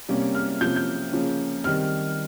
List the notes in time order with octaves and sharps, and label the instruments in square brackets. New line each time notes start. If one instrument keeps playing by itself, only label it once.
[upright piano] C3 G3 A#3 C#4
F6
C3 F3 A#3 C#4 G6
G6
C#3 F3 A#3 C#4
D#3 G3 C4 F6